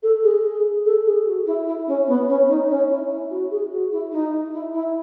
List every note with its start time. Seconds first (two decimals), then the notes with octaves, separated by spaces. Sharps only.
0.03 A4
0.23 G#4
0.44 G#4
0.85 A4
1.05 G#4
1.26 F#4
1.46 E4
1.66 E4
1.87 C#4
2.07 B3
2.28 C#4
2.48 D#4
2.69 C#4
2.89 E4
3.10 E4
3.30 F#4
3.51 G#4
3.71 F#4
3.92 E4
4.12 D#4
4.53 E4
4.74 E4